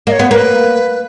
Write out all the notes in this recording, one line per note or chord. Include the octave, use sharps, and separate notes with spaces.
A#3 C#5 D#5
B3
A#3 B4